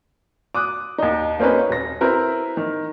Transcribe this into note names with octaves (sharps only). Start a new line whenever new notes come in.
D6 D#6 F#6
D#2 D#4
A#3 C4 C#4 D#4 B4
D#1 A#6
C4 E4 A#4 B4
D#3